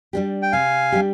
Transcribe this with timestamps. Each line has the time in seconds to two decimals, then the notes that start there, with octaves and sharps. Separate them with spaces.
0.13 G3 D4 G4
0.42 G5
0.52 C3 F5 G#5
0.92 G3 D4 G4